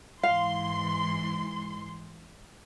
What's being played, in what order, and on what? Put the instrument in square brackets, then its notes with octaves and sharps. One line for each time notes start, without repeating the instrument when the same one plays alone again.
[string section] G#2 E3 C6 [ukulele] F5